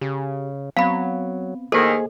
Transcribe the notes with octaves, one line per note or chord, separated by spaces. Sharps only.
C#3 G4
F#3 B3 C4 F5 B5
D#2 A2 D#3 A#3 G#4 A4 C5 D#5